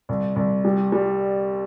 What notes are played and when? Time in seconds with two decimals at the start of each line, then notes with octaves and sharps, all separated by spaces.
0.09 C2
0.36 C2
0.65 G3
0.92 G3